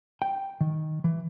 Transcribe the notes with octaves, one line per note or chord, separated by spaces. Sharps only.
G5
D#3
E3